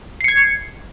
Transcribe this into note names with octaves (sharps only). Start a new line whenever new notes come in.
G#6 C7 C#7